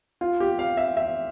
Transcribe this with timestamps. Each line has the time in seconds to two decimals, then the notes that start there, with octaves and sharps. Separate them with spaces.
0.21 F4
0.40 G4
0.59 F5
0.77 E5
0.97 E5